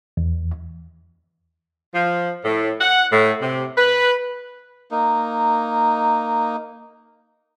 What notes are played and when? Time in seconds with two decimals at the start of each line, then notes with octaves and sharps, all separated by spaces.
0.17 E2
1.95 F3
2.45 A2
2.81 F#5
3.13 A2
3.42 C3
3.78 B4
4.91 A#3 D#4